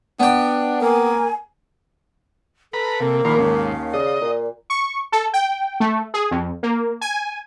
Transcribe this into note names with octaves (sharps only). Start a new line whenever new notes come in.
B3 D4 G5
A#3 A#4 G#5
A4 B4 A#5 B5
C3 A#3
A#1 A#2 D#3 A#4 B5 C7
D#2 G#2 D#3 C#4 F5
C#3 D5 D#5
A#2
C#6
A4
G5
A3
G#4
F2
A#3
G#5